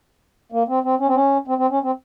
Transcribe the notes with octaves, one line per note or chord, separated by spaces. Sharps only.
A#3
C4
C4
C#4
C4
C#4
C4
C4
C#4
C4